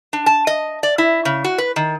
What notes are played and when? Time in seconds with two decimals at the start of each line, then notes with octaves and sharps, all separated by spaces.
0.13 D4
0.26 A5
0.47 D#5
0.83 D5
0.98 E4
1.25 C#3
1.44 F#4
1.58 B4
1.76 D#3